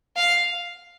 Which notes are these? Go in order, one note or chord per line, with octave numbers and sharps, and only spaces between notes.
F5